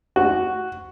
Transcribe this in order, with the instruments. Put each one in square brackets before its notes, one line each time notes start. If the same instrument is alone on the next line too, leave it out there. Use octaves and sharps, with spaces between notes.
[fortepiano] F#4